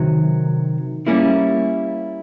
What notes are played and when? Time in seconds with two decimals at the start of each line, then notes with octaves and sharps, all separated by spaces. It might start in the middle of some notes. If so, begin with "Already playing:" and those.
Already playing: C3 D#3 F#3
1.07 G3 A#3 C#4 E4